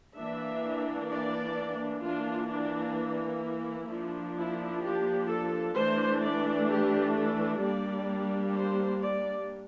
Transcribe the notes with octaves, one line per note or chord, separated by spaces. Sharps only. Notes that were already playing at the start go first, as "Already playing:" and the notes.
E3 A#3 D4 E5
D5
E3 A#3 D4 F4
D4
E4
F3 A#3 D4
E4
G4
A4
E3 A3 D4 C5
D5
G4
A4
G3 A#3 D4 D5
C5
D5